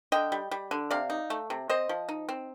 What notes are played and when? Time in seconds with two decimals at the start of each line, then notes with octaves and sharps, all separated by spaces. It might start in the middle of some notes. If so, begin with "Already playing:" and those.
0.12 D3 D#5 G5
0.32 G3
0.51 G3
0.71 D3
0.91 C3 D5 F5
1.10 D#4
1.30 A3
1.50 C3
1.70 C4 C5 D#5
1.89 F3
2.09 D#4
2.29 C4